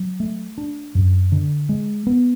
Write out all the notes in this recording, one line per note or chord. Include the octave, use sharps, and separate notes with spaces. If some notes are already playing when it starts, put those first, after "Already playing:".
Already playing: F#3
A3
D4
F#2
D3
G#3
B3